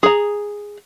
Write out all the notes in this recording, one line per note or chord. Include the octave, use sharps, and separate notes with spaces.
G#4 A#5